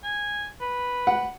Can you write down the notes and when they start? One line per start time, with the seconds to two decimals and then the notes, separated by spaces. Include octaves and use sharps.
0.04 G#5
0.61 B4
1.07 F#5